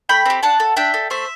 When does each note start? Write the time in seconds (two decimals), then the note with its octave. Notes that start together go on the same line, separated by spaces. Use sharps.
0.09 A3 G5 B5
0.26 C4 G4
0.43 D4 F#5 A5
0.60 A4
0.76 D4 E5 G5
0.94 A4
1.10 A3 C5 E5